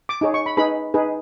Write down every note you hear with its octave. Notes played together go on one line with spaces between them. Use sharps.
D6
D#4 G#4 C#5
C#6
B5
D#4 G#4 B4 B5
D#4 G#4 B4